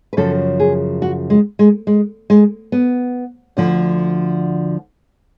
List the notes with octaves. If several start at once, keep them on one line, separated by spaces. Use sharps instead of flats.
B4
F#2 C#3 F3 A4
G#4
F#4
G#3
G#3
G#3
G#3
B3
D2 D3 F3